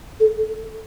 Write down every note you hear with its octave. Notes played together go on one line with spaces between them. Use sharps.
A4